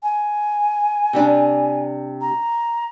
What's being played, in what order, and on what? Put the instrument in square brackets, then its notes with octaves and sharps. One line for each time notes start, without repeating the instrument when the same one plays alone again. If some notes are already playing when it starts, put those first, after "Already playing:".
[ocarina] G#5
[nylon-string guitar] C3 G3 D4
[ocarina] A#5